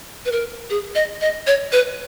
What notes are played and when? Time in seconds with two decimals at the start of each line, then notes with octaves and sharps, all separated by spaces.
0.25 B4
0.32 A#4
0.70 G#4
0.95 D#5
1.21 D#5
1.47 C#5
1.72 B4